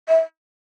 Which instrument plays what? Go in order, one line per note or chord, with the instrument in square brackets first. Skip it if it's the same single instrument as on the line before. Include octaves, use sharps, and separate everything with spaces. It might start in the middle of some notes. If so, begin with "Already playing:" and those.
[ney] E5